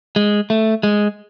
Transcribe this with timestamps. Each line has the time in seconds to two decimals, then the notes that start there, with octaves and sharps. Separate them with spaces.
0.16 G#3
0.50 A3
0.83 G#3